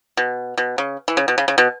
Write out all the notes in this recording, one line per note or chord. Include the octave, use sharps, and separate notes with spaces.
B2
B2
C#3
E3
C#3
B2
C#3
C#3
B2